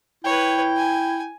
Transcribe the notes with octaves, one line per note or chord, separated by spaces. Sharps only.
E4 B4 C#5 G5
G#5